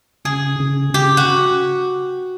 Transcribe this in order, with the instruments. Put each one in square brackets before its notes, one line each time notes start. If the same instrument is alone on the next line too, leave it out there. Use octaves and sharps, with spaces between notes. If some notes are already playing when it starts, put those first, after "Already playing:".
[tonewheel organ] C#3 [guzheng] G#4
[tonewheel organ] C#3
[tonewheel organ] C#3 [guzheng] G4
[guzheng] F#4